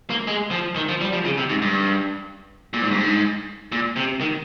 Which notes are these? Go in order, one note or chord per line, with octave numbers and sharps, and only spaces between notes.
A#3
G#3
F3
D#3
F3
G3
F3
C#3
C3
G#2
G2
A#2
G#2
G2
G#2
A#2
C3
D#3